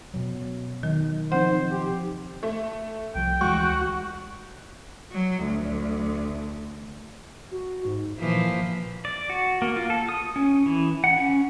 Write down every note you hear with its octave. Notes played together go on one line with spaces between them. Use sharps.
B2 F#3
D#3 F#3
F3 C4 D#4 C5 F#5
G4
A3
C2 F3 G5
D2 E3 G#3 F#4 C#6
F#3
D2
F#4
G#2
A#2 E3 F3 B6
D5
F#4
A#3
F4
A4
D#6
C#4
E3
F#5
C#4